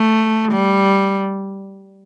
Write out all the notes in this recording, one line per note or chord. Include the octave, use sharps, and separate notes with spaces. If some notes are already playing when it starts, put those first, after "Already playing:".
Already playing: A3
G3